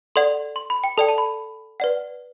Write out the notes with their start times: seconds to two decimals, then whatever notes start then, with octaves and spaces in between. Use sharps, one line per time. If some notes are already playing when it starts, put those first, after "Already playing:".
0.16 A4 D5 F#5 C6
0.56 C6
0.70 B5
0.84 G5
0.97 A4 D5 G5 A5
1.08 A5
1.18 B5
1.80 B4 D5 F#5